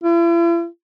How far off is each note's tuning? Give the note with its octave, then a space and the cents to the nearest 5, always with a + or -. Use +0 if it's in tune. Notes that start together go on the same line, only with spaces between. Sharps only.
E4 +45